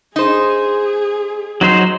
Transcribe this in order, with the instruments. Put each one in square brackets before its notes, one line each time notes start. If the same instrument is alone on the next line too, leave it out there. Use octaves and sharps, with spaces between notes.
[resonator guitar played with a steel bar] D#4 C5 [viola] G#4
[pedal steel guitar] F#3 D#4 C5